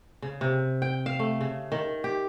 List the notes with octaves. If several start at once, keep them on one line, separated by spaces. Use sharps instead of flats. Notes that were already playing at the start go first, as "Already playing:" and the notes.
C#3
C3
G5
F5
A3
C#3
D#3
G4